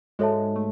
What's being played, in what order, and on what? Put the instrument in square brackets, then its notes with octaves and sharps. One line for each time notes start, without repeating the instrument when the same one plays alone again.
[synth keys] G#2 G#3 [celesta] F#4 A4 C#5 E5 A5
[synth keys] A3